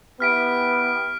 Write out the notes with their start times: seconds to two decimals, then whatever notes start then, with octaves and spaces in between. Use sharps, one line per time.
0.20 B3 E4 G4 F6 B6 D7